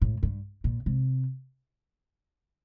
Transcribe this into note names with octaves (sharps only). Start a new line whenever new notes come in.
A2
G2
A#2
C3